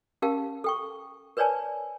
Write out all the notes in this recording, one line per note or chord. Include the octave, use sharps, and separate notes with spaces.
C#4 G4 A#4 F5 A5
A4 G5 C#6
A#4 B4 C#5 D5 G#5 A5